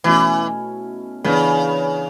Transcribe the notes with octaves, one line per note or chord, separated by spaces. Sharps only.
B2 E3 A3 C#4 E4
C#3 E3 B3 D4